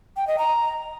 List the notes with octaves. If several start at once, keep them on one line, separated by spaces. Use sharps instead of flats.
G5
D#5
A#5